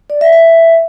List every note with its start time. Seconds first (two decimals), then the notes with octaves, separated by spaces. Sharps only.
0.10 D5
0.21 E5
0.33 E5